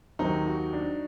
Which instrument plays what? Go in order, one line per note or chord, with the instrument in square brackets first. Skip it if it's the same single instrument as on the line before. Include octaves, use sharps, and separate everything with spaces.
[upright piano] D#2 D#3 F#3 C4 [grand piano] D#4
[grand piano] F#4
D4